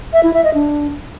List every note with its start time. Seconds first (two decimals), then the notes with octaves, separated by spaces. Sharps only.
0.13 E5
0.23 E4
0.34 E5
0.44 D#5
0.54 D4